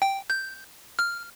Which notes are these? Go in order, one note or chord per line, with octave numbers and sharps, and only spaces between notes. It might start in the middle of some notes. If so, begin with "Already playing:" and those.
G5
G6
F6